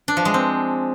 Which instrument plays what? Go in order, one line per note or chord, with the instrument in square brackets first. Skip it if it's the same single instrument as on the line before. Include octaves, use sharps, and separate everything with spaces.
[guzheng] D4
F3
G#3
C4